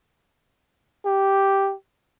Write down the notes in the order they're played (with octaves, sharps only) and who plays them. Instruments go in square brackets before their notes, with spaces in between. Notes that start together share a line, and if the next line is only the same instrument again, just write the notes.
[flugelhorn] G4